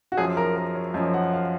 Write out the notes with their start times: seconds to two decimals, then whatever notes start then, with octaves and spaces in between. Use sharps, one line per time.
0.12 F#4
0.17 F#2 F3 G#4
0.37 A#4
0.56 A#4
0.75 C#5
0.94 F#2 D#5
0.97 F3
1.14 F#5
1.33 F5